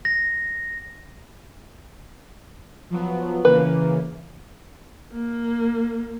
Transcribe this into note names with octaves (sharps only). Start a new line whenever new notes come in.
A#6
F3 F#3 B3
C#3 E3 A#3 B4
A#3